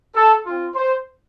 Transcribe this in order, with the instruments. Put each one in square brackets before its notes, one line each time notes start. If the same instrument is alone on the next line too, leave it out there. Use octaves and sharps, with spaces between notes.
[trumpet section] A4
C4 F4
C5